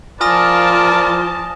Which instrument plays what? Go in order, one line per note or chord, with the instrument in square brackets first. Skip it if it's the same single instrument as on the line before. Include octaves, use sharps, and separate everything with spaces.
[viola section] F3 A5 [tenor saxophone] F4 [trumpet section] A#4 D5 [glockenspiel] G#5 D#6 A#6